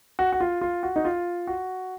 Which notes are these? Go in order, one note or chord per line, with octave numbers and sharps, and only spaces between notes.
F#4
F#4
F4
F4
F#4
D#4
F4
F#4